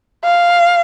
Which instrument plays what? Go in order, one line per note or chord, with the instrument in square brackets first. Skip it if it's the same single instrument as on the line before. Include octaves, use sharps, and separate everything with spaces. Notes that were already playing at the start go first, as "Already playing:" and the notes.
[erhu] F5